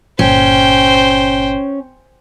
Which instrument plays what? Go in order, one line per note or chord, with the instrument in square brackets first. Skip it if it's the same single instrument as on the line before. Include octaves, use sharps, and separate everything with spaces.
[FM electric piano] G1 A#2 [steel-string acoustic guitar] C#4 [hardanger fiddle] C5 G5